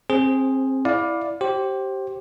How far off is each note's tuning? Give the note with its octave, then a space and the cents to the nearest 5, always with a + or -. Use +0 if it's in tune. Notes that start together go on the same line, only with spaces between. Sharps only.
C4 +25 G#4 +0 C5 +0
E4 +0 D5 +0 F5 +25
G4 -20 C5 +20